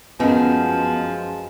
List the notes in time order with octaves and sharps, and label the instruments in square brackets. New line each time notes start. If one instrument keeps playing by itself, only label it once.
[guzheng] F#2 [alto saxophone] F3 [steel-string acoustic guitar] G#3 [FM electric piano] B3 B4